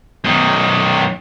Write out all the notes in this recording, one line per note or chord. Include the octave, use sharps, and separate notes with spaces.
F#2 D#3